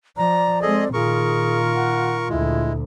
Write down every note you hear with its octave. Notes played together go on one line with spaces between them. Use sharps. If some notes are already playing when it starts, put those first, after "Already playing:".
F3 D5 A#5
G#3 C4 G#4 A4 D#5
A#2 D#3 F4 G#4 A#4 C#6
F#5
D2 A#2 G#3 E4